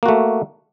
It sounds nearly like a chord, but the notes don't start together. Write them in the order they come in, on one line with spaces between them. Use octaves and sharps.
A#3 F#4 A3